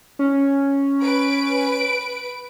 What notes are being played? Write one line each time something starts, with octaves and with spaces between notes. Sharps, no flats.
C#4
B4 D7